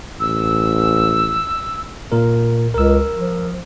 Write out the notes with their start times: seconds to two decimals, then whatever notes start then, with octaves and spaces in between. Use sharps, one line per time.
0.20 A1 E6
2.12 A#2 A#4
2.74 C#2 A#4 E6
3.14 F3